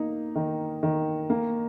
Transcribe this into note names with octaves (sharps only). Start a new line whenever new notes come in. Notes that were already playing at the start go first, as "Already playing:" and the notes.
Already playing: A#3 D#4
D#3
D#3
A#3